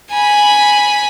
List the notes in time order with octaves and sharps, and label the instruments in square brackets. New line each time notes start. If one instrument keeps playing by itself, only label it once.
[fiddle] G#5 B5